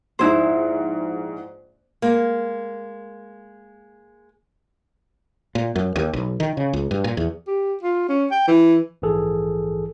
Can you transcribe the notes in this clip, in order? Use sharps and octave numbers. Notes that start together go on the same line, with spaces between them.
A#1 G#2 D#4 E4 C5
G#3 A#3
A#2
F#2
D#2
B1
D#3
C#3
C#2
G2
A#2
E2
G4
F4
C#4
G5
E3
A#1 G#2 E3 G#4 A4